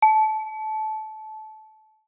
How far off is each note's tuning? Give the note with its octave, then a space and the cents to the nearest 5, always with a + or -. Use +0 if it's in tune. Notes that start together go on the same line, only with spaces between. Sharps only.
A5 -20